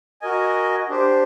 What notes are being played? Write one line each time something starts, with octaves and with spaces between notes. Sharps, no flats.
F#4 A#4 D#5 G#5
D4 G4 C5